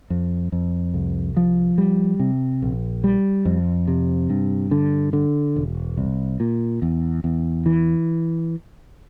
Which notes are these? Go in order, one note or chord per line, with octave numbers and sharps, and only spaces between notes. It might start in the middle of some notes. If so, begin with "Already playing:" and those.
F2
F2
C2
F3
G3
C3
A#1
G3
F2
C3
G2
D3
D3
E1
C2
A#2
E2
E2
E3